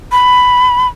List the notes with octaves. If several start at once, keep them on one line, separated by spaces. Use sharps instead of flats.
B5